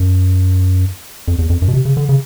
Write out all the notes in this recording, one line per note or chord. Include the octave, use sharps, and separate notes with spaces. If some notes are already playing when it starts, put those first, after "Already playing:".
Already playing: F#2
F2
E2
F2
F#2
B2
C3
C#3
D3
C#3